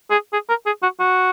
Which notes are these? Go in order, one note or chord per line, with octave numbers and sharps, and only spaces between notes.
G#4
G#4
A#4
G#4
F#4
F#4